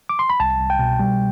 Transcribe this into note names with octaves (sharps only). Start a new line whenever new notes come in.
D6
C6
B5
C2 A5
C2
G5
B2
G3